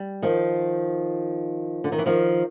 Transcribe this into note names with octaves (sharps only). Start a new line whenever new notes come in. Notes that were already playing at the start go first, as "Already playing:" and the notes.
Already playing: G3
D#3 F3
D3
D#3
E3
D#3 F3